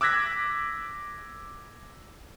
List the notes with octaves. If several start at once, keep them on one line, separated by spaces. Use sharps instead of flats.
D6 E6 F#6 G#6 A#6 B6